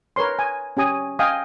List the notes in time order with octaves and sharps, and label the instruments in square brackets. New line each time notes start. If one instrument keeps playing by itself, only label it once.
[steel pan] A#4 B4 C#5 C6
G#5
C#4 G4 G#5 D#6
D#5 F5 G5 G#5 D#6